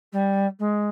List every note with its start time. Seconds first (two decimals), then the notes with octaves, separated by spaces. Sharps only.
0.12 G3
0.59 G#3